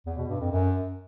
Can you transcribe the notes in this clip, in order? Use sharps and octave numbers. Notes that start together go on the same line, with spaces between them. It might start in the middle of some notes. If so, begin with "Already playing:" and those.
E2
B2
G2
F2
F#2